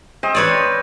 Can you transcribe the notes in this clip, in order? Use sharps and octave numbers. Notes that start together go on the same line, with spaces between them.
C4 C5 D#5
B4 C#5 D5